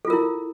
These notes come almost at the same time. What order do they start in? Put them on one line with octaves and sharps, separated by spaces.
A4 F4 A#4 E4